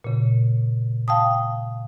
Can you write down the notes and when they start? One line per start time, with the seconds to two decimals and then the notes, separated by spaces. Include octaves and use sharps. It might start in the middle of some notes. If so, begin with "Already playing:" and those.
0.04 A#2 C#3
1.08 F5 G5 A5 D#6